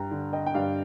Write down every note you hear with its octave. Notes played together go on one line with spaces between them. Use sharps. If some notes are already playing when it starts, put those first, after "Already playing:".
Already playing: G2 G5 A#5
D3
D#5 G5
G5
G2 D5 F5